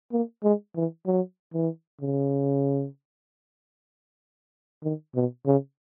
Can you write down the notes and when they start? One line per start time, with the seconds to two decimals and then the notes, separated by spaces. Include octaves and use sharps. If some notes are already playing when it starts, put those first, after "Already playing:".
0.12 A#3
0.43 G#3
0.76 E3
1.06 F#3
1.54 E3
2.01 C#3
4.83 D#3
5.15 B2
5.46 C#3